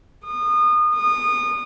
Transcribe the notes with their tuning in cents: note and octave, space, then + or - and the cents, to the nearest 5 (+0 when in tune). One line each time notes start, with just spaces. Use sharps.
D#6 -30
D#6 -25